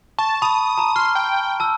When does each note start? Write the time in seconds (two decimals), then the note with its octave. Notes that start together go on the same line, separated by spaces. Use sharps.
0.19 A5 C#6
0.42 A5 B5 D#6
0.78 A5 A#5
0.96 C6 F6
1.15 G5
1.60 A5 E6